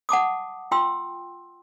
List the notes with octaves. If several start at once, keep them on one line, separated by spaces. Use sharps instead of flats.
F#5 A5 D6 D#6
F4 G5 C6 E6